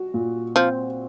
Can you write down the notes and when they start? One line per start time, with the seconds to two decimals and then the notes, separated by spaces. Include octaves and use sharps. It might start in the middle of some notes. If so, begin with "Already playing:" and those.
Already playing: F#4
0.14 A#2
0.55 F3 C4